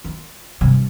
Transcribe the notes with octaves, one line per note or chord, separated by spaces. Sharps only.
F4
G2 C3